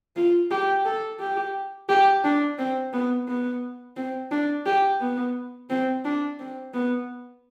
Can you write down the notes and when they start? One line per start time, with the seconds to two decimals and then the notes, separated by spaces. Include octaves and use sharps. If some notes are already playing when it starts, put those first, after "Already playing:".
0.16 F4
0.51 G4
0.85 A4
1.20 G4
1.89 G4
2.24 D4
2.59 C4
2.93 B3
3.28 B3
3.96 C4
4.31 D4
4.66 G4
5.00 B3
5.69 C4
6.05 D4
6.39 C4
6.74 B3